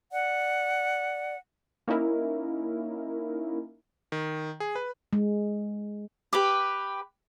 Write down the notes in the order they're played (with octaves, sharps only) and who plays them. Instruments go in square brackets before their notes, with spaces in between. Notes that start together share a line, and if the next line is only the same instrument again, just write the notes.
[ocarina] D5 [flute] F#5
[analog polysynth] A#3 C#4 D#4 E4 A#4
[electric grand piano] D#3
G#4
B4
[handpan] G#3
[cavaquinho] G4 B4 D6